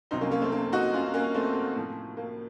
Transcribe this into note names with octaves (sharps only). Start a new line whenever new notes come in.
C2 C3 F#3 C4 D#4
A#3 C#4
A#3 C#4
A3 C4
A#3 C#4
D#4 F#4
C#4 F4
A#3 C#4
A3 C4
A2 F3
A#3